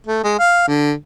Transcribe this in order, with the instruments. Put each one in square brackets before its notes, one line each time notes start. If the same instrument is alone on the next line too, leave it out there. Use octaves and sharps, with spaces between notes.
[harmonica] A3
G#3
F5
D3